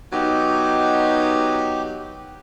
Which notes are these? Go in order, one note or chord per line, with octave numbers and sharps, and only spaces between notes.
F#3 B3 D#4 G4